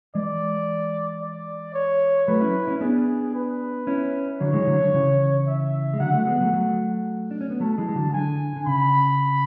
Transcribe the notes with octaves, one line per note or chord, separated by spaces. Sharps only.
E3 G#3 D5
D5
C#5
F#3 A3 B4
C#4 E4
C#4 E4
B3 D4 G#4
B4
C#4 E4
D3 F#3 C#5
E3 G#3
D3 F#3
D3
C#3 E3
E5
G#3
D3 F#3 F#5
F#3 A3
G#3 B3
F#3 A3
F#3 A3
D4
C#4
B3
F#3 A3 A5
E3 G#3
G#3
D3 F#3
D3 G#5
D3
C#3 B5